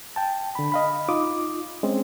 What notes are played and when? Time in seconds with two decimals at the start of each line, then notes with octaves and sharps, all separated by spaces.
0.16 G5 A5
0.55 D3 B5
0.72 D#5 F5 B5
1.09 D#4 F4 D6 D#6
1.83 G#3 C4 C#4